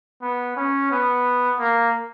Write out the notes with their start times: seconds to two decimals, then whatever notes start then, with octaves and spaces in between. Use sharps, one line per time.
0.22 B3
0.57 C#4
0.91 B3
1.59 A#3